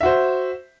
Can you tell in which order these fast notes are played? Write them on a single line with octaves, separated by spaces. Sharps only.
E5 F#4 C5